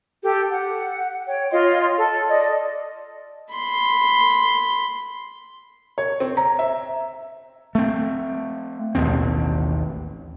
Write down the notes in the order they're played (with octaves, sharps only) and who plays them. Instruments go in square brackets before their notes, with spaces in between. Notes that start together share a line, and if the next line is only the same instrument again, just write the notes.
[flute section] G4 A4
F#5
C#5 G5
F4 C#5 D#5 C6
A4
D5 D#5
[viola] B5 C6
[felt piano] C#5
C4
A#5
E5
[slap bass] A3 C4
A1 D#2 B2 C4